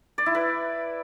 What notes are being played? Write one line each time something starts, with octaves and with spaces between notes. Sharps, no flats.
D5
E4
B4